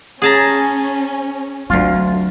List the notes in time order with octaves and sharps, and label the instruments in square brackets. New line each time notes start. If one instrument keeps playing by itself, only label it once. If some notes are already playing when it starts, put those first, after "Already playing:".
[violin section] C#4 [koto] G#4 A5 A#5
[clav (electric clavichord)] D2 F4 [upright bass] F#3 C4